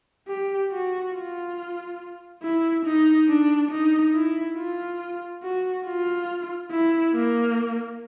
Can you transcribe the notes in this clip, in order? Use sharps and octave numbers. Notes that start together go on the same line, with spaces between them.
G4
F#4
F4
E4
D#4
D4
D#4
E4
F4
F#4
F4
E4
A#3